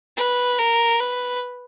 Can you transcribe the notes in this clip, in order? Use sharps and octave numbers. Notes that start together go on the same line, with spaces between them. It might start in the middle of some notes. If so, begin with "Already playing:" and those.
B4
A#4
B4